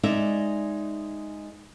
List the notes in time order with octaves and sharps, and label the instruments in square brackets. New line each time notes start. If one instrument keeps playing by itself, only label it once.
[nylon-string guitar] G#3 D#4 D5 E5